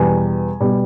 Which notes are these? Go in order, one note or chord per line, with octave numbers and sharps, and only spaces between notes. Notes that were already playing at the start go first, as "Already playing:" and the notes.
Already playing: E2 B2 G3 B3 G#5
B2 G3 B3